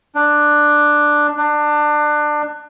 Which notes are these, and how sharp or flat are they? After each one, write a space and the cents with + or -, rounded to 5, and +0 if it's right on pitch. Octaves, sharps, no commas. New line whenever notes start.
D4 +10
D4 +25